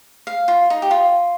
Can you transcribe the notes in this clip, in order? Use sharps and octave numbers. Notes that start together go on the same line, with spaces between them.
F5
F4
D#4
G4
F4